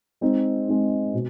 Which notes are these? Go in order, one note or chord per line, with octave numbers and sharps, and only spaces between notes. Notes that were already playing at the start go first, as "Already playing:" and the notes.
G#3 C4 D#4
G#3 C4 D#4
B2